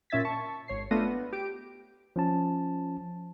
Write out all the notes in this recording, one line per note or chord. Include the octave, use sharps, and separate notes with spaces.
A#2 C#4 E5 G#6 A6 B6
A5 C#6
G#1 C#5 C7
A3 B3 D4 F4 A#6 D#7
B3
G4 D7
F3 C#4 A5